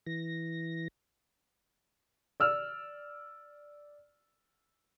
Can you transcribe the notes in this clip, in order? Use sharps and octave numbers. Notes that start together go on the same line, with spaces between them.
E3 A#6
D5 E6 F6